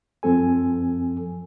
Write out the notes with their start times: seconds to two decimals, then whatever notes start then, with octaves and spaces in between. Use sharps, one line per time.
0.23 F#2 F3 C4 A4 G#5